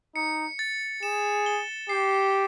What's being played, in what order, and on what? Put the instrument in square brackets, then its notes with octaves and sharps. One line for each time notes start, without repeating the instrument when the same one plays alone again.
[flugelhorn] D#4 [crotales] C#7
[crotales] A6
[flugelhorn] G#4 [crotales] E7
[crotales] G7
[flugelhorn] G4 [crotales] C7